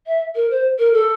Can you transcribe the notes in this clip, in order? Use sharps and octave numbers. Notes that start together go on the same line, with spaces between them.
E5
A#4
C5
A#4
A4